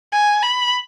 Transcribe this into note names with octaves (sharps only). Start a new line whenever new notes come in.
G#5
B5